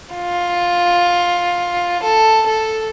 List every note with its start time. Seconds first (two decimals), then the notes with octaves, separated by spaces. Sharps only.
0.15 F4
2.03 A4
2.47 A4